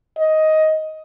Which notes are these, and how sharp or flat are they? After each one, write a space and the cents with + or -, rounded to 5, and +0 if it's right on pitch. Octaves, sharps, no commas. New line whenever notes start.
D#5 +10